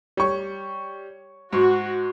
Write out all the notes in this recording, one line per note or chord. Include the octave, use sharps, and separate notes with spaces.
G3 C#5 C#6
G#2 F#4